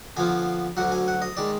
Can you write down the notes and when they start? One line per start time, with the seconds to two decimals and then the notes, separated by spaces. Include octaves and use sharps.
0.17 D3 F3 B3 F4 G#5
0.77 D2 D3 F#3 F#5
0.92 G#5
1.08 F#5
1.22 D#5
1.37 D#3 G#3 D5